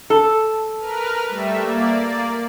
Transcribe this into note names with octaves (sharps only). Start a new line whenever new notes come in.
A4
A#4 B4 F6
G3 A3 E5
A#3 D5